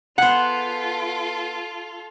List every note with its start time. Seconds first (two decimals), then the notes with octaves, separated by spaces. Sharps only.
0.18 B3 F4 G#4 A4 C5 F#5